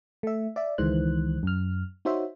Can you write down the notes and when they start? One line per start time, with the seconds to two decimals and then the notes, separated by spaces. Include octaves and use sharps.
0.23 A3 E5
0.56 D5 E5
0.78 C#2 D#3 E3 G#3 C5 F#6
1.43 F#2 F6
2.05 D#4 F#4 C5 C#5 E5